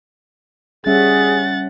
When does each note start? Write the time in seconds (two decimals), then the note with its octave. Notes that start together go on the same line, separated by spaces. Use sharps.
0.86 G3 C#4 G#4 E5 F#5 A6